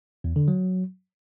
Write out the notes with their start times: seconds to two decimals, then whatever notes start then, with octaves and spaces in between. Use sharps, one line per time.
0.24 E2
0.36 D3
0.48 F#3